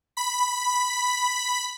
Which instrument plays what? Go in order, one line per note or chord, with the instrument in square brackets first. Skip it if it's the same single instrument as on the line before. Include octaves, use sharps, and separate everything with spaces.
[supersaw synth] B5 B6